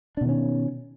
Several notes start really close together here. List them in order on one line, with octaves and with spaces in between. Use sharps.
D4 B2 D#3 C#4